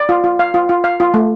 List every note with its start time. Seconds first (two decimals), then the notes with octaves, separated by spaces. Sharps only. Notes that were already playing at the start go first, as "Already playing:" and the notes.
Already playing: D5
0.09 F4
0.24 F4
0.39 F5
0.54 F4
0.69 F4
0.84 F5
1.00 F4
1.14 A3